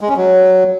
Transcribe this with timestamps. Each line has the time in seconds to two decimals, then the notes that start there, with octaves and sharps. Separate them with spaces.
0.01 G#3
0.09 C#4
0.16 F#3